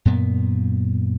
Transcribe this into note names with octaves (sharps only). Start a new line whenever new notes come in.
F#2 A#2 B3